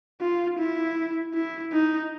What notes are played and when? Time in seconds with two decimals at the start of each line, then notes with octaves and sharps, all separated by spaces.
0.21 F4
0.59 E4
1.34 E4
1.73 D#4